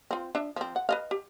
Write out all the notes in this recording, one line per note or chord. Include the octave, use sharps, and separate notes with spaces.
C4 F4
D4 E5
F3 C4
F#5
B4 D#5 F5
G4